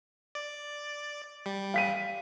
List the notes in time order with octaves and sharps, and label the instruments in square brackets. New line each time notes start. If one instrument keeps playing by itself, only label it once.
[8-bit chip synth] D5
G3
[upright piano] F5 B6 D#7